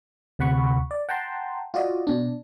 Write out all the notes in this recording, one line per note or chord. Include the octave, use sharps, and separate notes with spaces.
D2 C3 F#5 B5 C#6
D5
F#5 G5 A5 A#5 C6
F4 F#4 D5 D#5
B2 D4